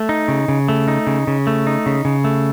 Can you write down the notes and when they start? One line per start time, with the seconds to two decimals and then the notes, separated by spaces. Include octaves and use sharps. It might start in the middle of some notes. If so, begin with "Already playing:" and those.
Already playing: A3
0.09 D#4
0.28 C#3
0.48 C#3
0.68 A3
0.88 D#4
1.07 C#3
1.27 C#3
1.47 A3
1.67 D#4
1.86 C#3
2.05 C#3
2.24 A3